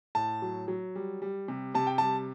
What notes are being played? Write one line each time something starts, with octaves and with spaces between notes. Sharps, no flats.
A2 A5
F#3
F#3
G3
G3
C3
C3 A5
G5
G3 A5